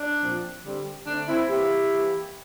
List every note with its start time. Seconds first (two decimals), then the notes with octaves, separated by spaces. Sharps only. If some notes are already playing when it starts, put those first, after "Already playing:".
Already playing: D4
0.20 A#2 F3 C4
0.63 D3 G3 C4
1.06 D3 A3 C4 D4
1.28 C4 E4
1.49 E3 A#3 E4 G4
1.92 E3 A#3